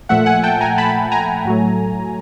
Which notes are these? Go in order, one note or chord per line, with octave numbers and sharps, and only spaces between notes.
A#2 F3 A3 E5 F#5
F#5 G#5
G5 A5
G#5 A#5
A5 B5
G#5 A#5
A2 F#3 A3